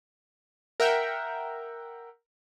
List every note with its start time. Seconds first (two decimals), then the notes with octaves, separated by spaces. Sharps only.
0.80 A#4 E5 F#5 G5